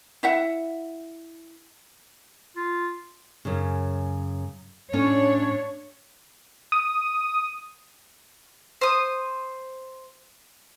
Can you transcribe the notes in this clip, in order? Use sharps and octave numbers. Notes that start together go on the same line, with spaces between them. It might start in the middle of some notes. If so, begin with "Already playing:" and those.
E4 E5 F#5
F4
F#2 C#3
A2 A3 C#4 D4 C#5
D#6
C5 D#6